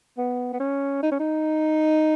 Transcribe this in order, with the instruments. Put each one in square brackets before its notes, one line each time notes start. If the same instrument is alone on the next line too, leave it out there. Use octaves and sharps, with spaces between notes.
[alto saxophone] B3
B3
C#4
D#4
C#4
D#4